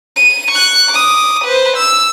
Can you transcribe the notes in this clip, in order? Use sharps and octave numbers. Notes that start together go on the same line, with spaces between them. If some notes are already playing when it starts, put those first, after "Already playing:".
D#7
C#6 F#6
D6 D#6
B4 C5
E6